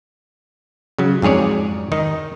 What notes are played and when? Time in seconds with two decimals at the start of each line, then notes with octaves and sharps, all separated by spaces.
0.99 C#3 F#3
1.22 F2 G#2 G#4 C#5 D5
1.92 D#3 D#4